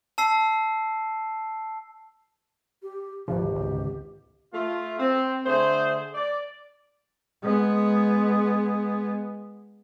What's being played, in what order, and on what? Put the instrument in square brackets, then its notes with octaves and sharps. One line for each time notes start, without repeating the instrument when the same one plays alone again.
[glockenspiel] A5 E6 C7
[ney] G4
[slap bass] G#1 D2 B2 [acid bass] F3 [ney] G4
[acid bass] C#2
[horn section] A3 F4
C4
D3 A3 G#4 C5
D5
[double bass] G#3 B3